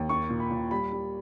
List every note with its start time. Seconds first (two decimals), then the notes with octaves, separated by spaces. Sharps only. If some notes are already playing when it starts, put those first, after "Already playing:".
Already playing: D#2
0.09 A#3 C#6
0.30 A#2
0.40 B5
0.51 A#2
0.71 G3 B5
0.92 G3